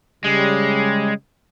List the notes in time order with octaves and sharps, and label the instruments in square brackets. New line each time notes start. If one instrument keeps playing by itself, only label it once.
[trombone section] C#3 G3 [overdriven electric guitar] G#3